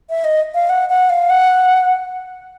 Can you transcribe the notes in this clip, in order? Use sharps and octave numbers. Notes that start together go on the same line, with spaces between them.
E5
D#5
F5
F#5
F#5
F5
F#5